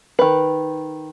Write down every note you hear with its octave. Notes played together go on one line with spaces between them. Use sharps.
D#3 B4